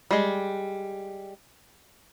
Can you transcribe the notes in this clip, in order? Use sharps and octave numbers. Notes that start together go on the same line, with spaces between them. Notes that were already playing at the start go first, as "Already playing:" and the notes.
G3 G#3